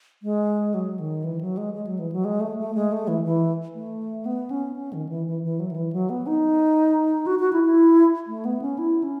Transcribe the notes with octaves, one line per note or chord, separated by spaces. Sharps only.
G#3
F#3
D#3
E3
F#3
G#3
G#3
F#3
E3
F#3
G#3
A3
A3
G#3
A3
E3
E3
A3
B3
C#4
C#4
D#3
E3
E3
E3
F#3
D#3
E3
F#3
B3
D#4
F#4
F#4
E4
E4
A3
B3
C#4
E4
C#4